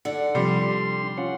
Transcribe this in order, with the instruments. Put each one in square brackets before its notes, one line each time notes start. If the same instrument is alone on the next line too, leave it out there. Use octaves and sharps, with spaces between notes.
[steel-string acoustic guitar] D3 D5 [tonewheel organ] F#5
[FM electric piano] C3 F3 [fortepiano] G3 [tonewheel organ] C6
[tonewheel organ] C#4 F4 F#5